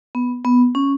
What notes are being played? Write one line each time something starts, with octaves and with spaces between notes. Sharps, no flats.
B3
B3
C#4